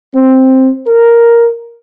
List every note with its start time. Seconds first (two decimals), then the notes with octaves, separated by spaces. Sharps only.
0.14 C4
0.87 A#4